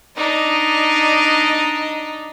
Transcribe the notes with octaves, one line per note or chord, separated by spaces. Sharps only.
D4 D#4 D#5